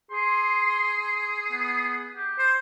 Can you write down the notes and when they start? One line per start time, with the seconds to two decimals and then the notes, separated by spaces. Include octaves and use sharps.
0.11 G#4 C6
1.51 B3
2.16 G4
2.38 C5